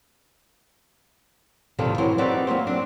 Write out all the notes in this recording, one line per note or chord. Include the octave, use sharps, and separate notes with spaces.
C3 D#3 F3 G3 A4
E3 F#3 F#4 A#4 C5
C4 D#4 F#4 G4 B4 D5
F#3 A#3 G4 C5
C4 D4